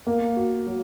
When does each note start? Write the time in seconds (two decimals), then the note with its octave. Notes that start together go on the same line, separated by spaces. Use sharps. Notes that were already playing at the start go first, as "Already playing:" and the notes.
0.07 A#3
0.37 F#4
0.67 F#3